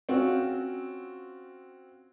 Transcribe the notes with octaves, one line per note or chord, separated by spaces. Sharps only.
C4 C#4 F4 F#4